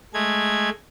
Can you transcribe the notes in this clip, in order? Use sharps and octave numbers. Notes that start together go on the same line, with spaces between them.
G#3 A3 G#6